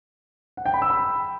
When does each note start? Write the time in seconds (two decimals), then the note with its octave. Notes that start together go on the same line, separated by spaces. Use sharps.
0.57 F#5
0.66 G5
0.74 B5
0.82 E6
0.90 B5